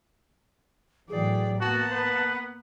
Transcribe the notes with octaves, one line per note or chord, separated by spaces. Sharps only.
A2 E3 F#3 G#4 D5 G5
A#3 B3 F#4 F#5 A5
B4